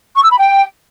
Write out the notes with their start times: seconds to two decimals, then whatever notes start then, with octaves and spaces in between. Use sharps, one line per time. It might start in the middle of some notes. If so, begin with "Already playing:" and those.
0.15 C#6
0.23 E6
0.31 B5
0.39 G5